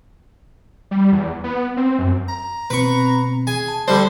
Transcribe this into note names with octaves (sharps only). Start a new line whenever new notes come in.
G3
E2
B3
C4
F#2
A#5
B2 C4 B4 C#6
G#4 G#5
A5
D3 G3 D4 C5